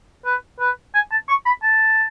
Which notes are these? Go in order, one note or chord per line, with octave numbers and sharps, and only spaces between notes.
B4
B4
G#5
A5
C#6
B5
A5